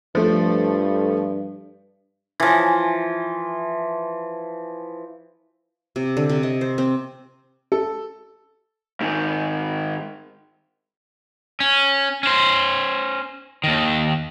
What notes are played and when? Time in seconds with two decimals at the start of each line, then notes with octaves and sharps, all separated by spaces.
0.15 G2 F3 A3
2.40 E3 F3
5.96 C3
6.17 D3
6.29 C3
6.43 D#5
6.61 C5
6.78 C4
7.72 A4
9.01 G#2 D#3
11.60 C#4
12.23 C#4 C5
13.64 D#2 D#3